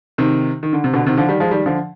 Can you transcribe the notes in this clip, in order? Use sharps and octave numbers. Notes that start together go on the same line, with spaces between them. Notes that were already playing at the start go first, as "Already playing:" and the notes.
C3 D#3
D#3
D3
C3
B2 D3
C3 D#3
D3 F3
D#3 G3
F3 G#3
D#3 G3
D3 F3